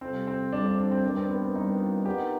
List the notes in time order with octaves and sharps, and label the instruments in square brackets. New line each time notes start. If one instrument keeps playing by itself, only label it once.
[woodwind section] F2 C3 G3 [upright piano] C4
[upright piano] C4
[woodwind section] F2 C3 G3 [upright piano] D4
[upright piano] D4
D4
C4
[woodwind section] G2 D#3 G3 [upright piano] D4
[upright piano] C4
B3
C4
[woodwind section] G2 D#3 G3 [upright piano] D#4
[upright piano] F4
[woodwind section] D#3 B3 D#4 [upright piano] G4